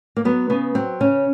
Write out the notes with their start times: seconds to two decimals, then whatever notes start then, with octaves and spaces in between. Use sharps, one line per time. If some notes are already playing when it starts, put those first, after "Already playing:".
0.16 A#3
0.25 F#3 B3
0.50 C#3 B3
0.75 F#3 C4
1.00 C#3 C#4